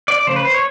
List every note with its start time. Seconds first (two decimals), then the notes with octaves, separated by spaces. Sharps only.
0.08 D5
0.27 C#3 F3 A3 C5
0.36 B4
0.45 C5
0.54 C#5